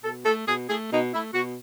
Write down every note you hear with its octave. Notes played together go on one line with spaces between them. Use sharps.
B2 A4
A3 A4
B2 G#4
A3 G#4
B2 D#4
A3 E4
B2 F#4